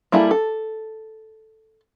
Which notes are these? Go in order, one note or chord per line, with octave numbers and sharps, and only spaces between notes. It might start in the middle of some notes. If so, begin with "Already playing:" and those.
G3 A#3 E4 G#4 A4
A4